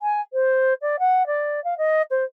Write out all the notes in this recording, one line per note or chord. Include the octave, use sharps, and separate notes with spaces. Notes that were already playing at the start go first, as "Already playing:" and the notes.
G#5
C5
D5
F#5
D5
F5
D#5
C5